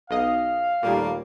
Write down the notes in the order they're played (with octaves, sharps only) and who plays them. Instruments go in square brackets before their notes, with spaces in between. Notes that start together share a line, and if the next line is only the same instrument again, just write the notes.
[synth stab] B1 D#5 [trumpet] F5
[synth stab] D#2 A#2 [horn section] G3 A3 A#3